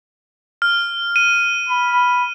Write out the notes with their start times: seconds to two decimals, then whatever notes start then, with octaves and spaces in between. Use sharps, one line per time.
0.62 F6
1.16 D#7
1.68 B5